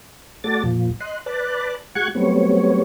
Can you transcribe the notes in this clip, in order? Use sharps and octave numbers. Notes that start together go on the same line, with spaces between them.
A3 F#4 A4 D5 A6
F2 A#2 F3
D#5 C6 F#6
B4 D5 A5 F#6
G#3 F#4 F#5 C#6 F#6 G#6
F#3 G3 A3 B3 C4 C#5